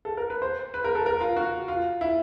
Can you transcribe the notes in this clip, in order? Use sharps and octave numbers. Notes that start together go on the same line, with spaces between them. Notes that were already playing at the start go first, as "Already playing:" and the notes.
A4
A#4
B4
C5
B4
A#4
A4
A#4
F4
F#4
F4
E4